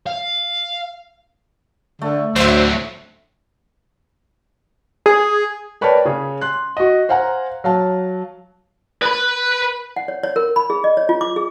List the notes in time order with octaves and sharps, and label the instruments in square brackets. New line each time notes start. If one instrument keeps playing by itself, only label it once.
[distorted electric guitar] F5
[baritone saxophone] D3 [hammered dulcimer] A3
[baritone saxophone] D2 [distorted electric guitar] A2 F#3 [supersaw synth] C5 E5
[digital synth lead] G#4
[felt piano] A#4 B4 C#5 D5 G5 A5
C#3 G#4 C#5
C6 F#6
F#4 D#5
C5 F5 F#5 G#5 A#5
F#3 F5 A5
[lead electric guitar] B4 B5
[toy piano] F#5
C#5
C#5
A#4
B5
G#4
D#5
C#5
F4
D6
G#4